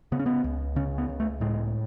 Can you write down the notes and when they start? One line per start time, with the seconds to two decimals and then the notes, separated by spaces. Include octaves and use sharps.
0.12 C#3 B3
0.19 C#4
0.26 B3
0.44 C#2
0.76 C#3 C#4
0.98 B3
1.09 C#2
1.20 A3
1.41 A2 G#3